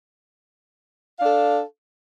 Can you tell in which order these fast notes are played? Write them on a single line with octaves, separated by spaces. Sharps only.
F5 D4 A4